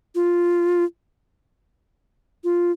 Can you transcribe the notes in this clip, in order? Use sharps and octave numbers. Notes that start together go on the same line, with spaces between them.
F4
F4